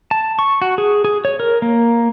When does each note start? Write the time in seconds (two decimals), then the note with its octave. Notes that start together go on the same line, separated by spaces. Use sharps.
0.11 A5
0.39 C#6
0.62 F#4
0.78 G#4
1.05 G#4
1.25 C#5
1.40 A#4
1.62 A#3